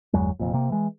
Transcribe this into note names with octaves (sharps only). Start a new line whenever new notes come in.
G1 E2 F#3 G#3
F1 F2 A#2
C3 A#3
E3 G#3